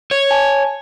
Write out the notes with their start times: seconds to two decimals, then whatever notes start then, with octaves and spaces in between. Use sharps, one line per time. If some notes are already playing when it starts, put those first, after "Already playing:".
0.11 C#5
0.31 G#5 A5